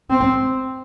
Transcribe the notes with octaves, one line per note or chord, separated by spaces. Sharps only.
C4